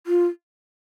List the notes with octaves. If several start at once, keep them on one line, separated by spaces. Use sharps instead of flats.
F4